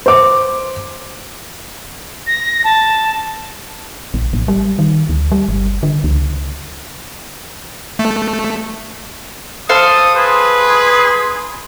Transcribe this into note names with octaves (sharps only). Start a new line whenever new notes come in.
C5 D6
A#6
A5
A#1
A1
G3
D#3
D2
G3
G1
D3
C#2
A3
A4 C5 F5 D#6
G#4 B4 C6